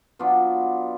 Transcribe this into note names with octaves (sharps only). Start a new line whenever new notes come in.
F#3 B3 D4 F4